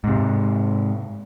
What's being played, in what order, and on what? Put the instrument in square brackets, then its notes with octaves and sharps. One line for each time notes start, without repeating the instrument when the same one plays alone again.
[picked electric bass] G#2 C3